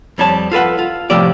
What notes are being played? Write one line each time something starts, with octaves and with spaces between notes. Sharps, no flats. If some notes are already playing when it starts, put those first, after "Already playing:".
F2 G3 C#5 A5
F4 A4 B4 F#5
F4
A2 C3 F3 A3 G4 D5